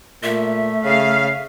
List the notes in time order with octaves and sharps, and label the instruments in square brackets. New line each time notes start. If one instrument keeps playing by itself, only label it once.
[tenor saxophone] A#2 [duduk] A3 [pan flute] E5
[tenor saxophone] C#3 [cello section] F5